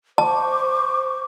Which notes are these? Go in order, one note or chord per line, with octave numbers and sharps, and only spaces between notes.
C5 A5 C#6 D6